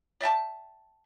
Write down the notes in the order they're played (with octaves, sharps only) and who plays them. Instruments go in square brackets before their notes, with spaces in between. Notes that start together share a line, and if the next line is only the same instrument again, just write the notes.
[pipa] D5 E5 G5 A5